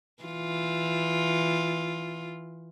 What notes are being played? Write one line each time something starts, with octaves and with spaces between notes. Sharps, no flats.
E3 F4